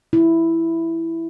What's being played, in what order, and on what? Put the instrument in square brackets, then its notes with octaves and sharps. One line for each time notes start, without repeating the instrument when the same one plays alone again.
[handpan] E4